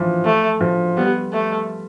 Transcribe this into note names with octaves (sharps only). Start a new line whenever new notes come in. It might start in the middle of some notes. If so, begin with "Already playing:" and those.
Already playing: E3 F3
A3
F3
G3 B3
A3